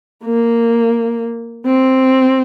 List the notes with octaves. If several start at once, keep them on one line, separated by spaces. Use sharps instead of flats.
A#3
C4